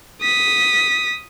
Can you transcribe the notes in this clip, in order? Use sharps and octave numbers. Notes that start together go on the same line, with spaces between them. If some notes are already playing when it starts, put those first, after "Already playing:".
D#6 B6